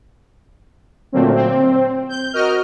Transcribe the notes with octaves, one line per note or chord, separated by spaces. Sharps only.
A#2 D3 F#3 A3 A#3 C4
C4
G6
F#4 A#4 D#5 F6